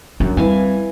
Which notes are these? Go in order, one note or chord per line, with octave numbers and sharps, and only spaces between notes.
F#2 D4
E3 G3 C4 F5 G#5